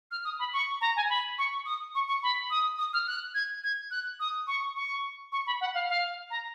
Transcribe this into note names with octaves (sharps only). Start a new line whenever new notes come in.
F6
D#6
B5
C#6
A#5
G#5
B5
C#6
D#6
C#6
C#6
B5
D#6
D#6
F6
F#6
G#6
G#6
F#6
D#6
C#6
C#6
C#6
B5
F#5
F5
F5
A#5